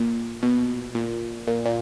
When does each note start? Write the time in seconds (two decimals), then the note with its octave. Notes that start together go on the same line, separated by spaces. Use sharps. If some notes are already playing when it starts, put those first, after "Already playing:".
Already playing: A#2
0.43 B2
0.95 A#2
1.47 A#2
1.66 A#2